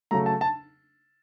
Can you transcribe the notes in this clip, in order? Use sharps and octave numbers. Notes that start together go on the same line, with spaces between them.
C#3 F#3 A3 A#5
A5
A5